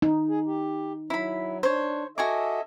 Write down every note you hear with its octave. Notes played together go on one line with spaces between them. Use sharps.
D#4
G#4
G4
F#3 E4 B5
D4 C5 C#5
F#4 A4 D#5 E5 G#5 D6